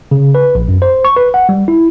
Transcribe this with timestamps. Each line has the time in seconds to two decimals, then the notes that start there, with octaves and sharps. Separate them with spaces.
0.11 C#3
0.35 B4
0.55 A#1
0.69 F#2
0.82 C5
1.05 C#6
1.17 B4
1.34 F#5
1.49 G3
1.68 E4